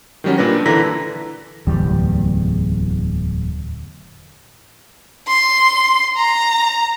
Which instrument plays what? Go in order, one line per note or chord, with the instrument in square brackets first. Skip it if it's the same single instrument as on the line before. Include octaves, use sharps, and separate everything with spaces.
[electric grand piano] D#3 F#3 G3 C#4 F#4
A#2 A#3 D4 B4 A#6
D3 E3 A4 A#5 A#6 B6
[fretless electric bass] D1 E2 G3
[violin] C6
A#5